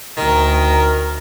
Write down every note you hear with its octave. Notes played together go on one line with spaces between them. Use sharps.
D2 D#3 A#4